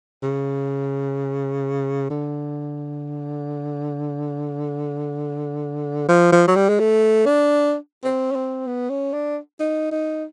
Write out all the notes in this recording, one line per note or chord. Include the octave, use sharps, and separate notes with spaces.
C#3
D3
F3
F3
F#3
G3
G#3
A3
D4
C4
C#4
C4
B3
C#4
D4
D#4
D#4